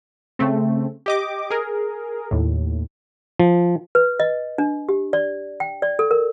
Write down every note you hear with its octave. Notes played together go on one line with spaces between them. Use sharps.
C#3 A3 C4
G4 D#5 D6
G#4 A#4
D#2 A2
F3
B4
D#5
D4
G4
D5
G5
D5
A4
A#4